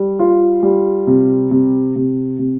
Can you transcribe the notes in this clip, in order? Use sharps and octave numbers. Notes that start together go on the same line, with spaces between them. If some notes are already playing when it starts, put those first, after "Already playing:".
Already playing: G3
F4
G3
C3
C3
C3
C3